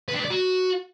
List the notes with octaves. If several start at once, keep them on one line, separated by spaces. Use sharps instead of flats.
B4
D4
B4
D5
F#4